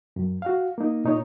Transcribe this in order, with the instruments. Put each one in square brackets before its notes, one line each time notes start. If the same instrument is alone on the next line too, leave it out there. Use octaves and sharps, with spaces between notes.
[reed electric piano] F#2
F#4 F5
A#3 D#4
A#2 D#4 C#5